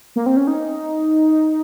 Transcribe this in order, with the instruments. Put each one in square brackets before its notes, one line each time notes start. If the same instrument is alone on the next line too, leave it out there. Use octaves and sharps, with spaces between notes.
[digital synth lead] A#3
C4
C#4
D#4